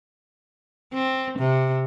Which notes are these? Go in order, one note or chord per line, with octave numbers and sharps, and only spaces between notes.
C4
C3